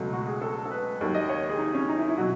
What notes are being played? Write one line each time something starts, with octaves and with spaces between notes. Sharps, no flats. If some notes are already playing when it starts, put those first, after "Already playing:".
Already playing: C#2 B2 F#3 A3
F#4
G#4
A4
A4
B4
D#2 D#3 F#3
D#5
C#5
G#4
D#4
C#4
D#4
E4
E4
B2 F#3 F#4